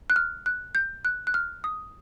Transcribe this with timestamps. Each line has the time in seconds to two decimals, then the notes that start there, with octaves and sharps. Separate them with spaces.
0.10 F#6
0.16 F6
0.46 F#6
0.75 G6
1.05 F#6
1.27 F#6
1.34 F6
1.64 D#6